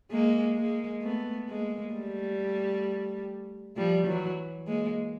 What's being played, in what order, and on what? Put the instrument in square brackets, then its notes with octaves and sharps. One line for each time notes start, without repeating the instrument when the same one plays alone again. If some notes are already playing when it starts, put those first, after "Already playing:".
[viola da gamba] G#3 A#3
G#3 A#3
A3 B3
G#3 A#3
G3 A3
F3 G3
E3 F#3
G#3 A#3